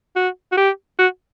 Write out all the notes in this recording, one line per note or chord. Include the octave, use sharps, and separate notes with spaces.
F#4
F#4
G4
F#4